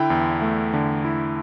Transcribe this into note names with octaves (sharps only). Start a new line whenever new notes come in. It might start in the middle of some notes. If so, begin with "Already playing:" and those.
Already playing: D3 E4 G5
E2
A3
D3
E4